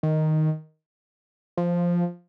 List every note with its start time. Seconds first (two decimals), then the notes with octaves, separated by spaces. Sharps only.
0.03 D#3
1.57 F3